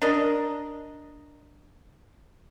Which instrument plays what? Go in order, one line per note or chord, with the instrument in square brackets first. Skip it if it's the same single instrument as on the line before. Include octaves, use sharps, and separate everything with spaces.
[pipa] D4 A#4 D#5